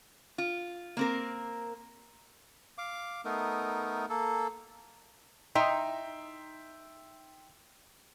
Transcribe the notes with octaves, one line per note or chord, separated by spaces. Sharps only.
F4
A#3 C4 A#4
F5 D6
A3 B3 D#4 A#4
A#3 A4
D#4 E5 G5 C6